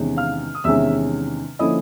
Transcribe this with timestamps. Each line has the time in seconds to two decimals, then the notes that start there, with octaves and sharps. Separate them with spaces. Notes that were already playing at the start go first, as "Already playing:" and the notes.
Already playing: E2 C3 D#3 G#3 C#4
0.17 F5 F6
0.55 D#6
0.64 E2 C3 D#3 G#3 C#4 E5 E6
1.59 D3 F3 A#3 C#4 E4 D#5 D#6